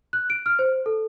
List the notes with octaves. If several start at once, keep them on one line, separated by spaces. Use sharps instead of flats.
F#6
D7
F6
C5
A4